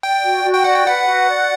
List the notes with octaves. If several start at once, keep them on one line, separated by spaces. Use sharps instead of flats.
D5 G5
F#4
F#4
G5
D5 F#5
G5
B4 F#5
F#4
D5